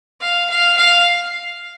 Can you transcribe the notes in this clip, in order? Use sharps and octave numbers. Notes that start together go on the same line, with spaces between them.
F5
F5
F5